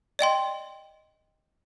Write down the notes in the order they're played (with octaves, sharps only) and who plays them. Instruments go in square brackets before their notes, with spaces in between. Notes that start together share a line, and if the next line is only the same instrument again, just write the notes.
[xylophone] D5 D#5 G5 C6